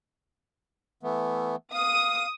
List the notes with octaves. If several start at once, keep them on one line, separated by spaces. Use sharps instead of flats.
E3 A3 B3
F5 D#6